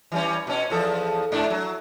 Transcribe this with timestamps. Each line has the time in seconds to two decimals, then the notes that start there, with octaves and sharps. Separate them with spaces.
0.12 E3 G3 C#4
0.47 B2 C#4
0.70 E2 F3 A4
1.32 G#2 D4
1.50 F#3